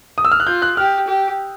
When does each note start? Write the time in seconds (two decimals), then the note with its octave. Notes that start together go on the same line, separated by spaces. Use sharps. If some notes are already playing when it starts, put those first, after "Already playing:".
0.18 D#6
0.25 E6
0.32 F6
0.40 F#6
0.47 F4 G6
0.62 F#6
0.77 G4 F6
1.08 G4